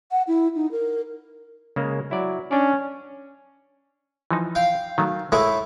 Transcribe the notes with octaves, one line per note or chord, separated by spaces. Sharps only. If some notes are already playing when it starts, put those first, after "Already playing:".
F#5
E4
D#4
A#4
C#3 G#3 A#3
F#3 E4 D5
C#4 D4 D5
E3 F3 D#4
F5 G5
D#3 F#3 A3
A2 G#3 A3 E4